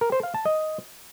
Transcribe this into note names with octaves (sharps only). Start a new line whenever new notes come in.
A#4
C5
F5
A5
D#5